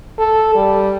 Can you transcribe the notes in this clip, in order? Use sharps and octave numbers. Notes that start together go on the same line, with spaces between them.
A4
G3